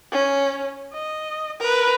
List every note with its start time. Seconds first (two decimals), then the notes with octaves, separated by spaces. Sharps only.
0.12 C#4
0.93 D#5
1.60 A#4 B4